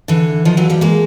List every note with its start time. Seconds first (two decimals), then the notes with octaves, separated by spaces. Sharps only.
0.08 D3 E3
0.45 D#3 F3
0.57 E3 F#3
0.70 F3 G3
0.81 G#3 A#3